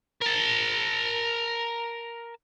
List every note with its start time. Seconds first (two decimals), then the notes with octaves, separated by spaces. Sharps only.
0.21 A#4 A5